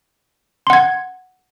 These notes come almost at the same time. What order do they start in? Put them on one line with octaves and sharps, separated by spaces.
C6 F#5 G#6